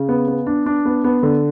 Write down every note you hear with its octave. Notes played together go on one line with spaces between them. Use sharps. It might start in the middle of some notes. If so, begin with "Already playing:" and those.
Already playing: C#3
B3
B3
D4
D4
B3
B3
D3